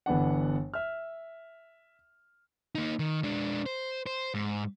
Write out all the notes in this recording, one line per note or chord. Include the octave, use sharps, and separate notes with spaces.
G1 E3 B3 D4 F#5
E5 F6
A#3 D#4
D#3
G#3 D4
C5
C5
G#2